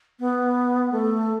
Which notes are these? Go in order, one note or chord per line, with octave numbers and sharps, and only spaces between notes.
B3
A3